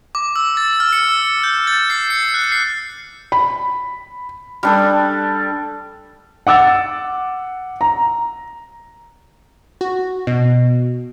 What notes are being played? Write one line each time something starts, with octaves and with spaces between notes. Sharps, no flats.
D6
E6
A6
F6
C#7
E6
G6
A6
C7
C#7
F#6
C7
B5
G3 D4 A4
F#5 D6 E6 A6
A#5
F#4
B2